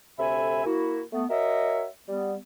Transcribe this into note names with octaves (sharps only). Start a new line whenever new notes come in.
D2 C3 A4 E5 G#5 B5
A#3 E4 F#4
A3 B3
F#4 A#4 C#5 D#5 E5
G3 B3